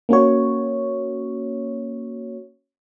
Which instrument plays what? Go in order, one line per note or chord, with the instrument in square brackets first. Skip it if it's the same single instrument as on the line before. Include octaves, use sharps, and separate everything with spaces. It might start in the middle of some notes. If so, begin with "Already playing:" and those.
[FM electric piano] A#3 C#4 F#4 C#5